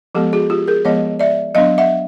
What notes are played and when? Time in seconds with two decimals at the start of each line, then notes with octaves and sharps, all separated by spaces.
0.15 F3 G#3 B3 G4 A4
0.33 F#4 G#4
0.50 F4 G4
0.67 G#4 A#4
0.85 F3 G#3 B3 C#5 D#5
1.20 D5 E5
1.55 F#3 B3 D4 D#5 F5
1.78 E5 F#5